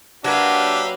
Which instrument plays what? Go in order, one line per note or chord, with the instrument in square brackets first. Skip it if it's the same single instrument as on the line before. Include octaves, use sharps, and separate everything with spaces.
[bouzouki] F#3 A#3 [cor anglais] D4 [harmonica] G4 E5 [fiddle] B4 F5